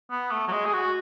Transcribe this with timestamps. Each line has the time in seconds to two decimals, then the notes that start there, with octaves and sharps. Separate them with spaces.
0.11 B3
0.32 A3
0.48 F#3
0.52 G#3
0.65 G#4
0.73 F#4